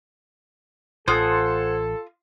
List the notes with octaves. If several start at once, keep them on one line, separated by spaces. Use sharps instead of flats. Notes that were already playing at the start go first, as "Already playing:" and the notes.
A1 F4 A4 C5 F#5 G#5 D#6